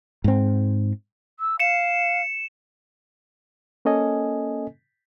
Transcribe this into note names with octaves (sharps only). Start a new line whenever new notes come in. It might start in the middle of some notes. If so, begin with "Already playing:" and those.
G#2 C4
E6
F5 C#7 E7
A#3 C#4 A4 D#5 G#5